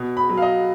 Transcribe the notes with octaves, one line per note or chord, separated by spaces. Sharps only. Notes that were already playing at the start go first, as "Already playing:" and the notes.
Already playing: B2
B5
F#3
F5
D#5